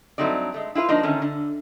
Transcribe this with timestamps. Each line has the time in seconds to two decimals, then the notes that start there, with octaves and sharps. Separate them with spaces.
0.18 G2 F#3 A3 C4 D#4 D5
0.54 G#3 A3
0.75 E4 F4 G#4 B4
0.89 F3 A#3 D4 D#4
1.03 D3 D#3 A3 C#4
1.22 D3